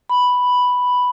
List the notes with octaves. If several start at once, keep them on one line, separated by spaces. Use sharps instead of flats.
B5